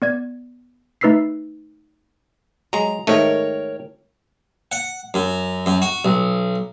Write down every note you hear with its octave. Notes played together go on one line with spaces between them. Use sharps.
B3 D5 G#6
A3 D#4 B4 E6 B6 C7
F#3 G#3 A#5
G#2 D#3 A3 A#4 C#5 G5
F#5
F#2
F#2
F#4
B1